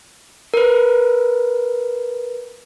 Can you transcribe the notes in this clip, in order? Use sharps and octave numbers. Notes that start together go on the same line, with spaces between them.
A#4 B4